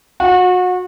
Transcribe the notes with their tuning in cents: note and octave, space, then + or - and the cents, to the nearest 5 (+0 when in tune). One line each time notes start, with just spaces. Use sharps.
F#4 -30